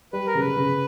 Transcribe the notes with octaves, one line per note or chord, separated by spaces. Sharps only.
G3 B4
A#4
C#3
B4
C#3